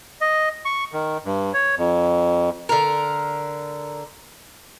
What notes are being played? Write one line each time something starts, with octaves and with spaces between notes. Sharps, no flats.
D#5
C#6
D#3
G2
C#5
F2
D3 A#4